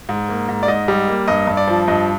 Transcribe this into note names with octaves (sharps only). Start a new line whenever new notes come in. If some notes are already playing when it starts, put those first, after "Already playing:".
G#2
A#3
G#2
D5
G#2 D#5
G3
A#3
G2 D#5
G2
D5
F3
G2 D#5